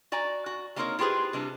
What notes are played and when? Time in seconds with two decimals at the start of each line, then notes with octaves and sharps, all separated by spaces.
0.12 F#4 D5 G#5 A#5
0.46 F#4
0.76 G3 A#3 C4 D#4 A#4 C#5
0.99 E4 F4 G4 G#4 B4 C5
1.33 C3 G3 D4